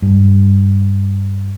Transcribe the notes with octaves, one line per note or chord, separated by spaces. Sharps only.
G2